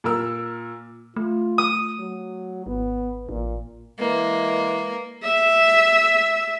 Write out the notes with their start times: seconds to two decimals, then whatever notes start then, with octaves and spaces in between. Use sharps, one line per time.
0.04 A#2 A#4 E6
1.16 A3 F4
1.58 D#6
1.99 F#3
2.67 G#1 B3
3.29 A1 A#2
3.99 E3 G#3 A#3
5.24 E5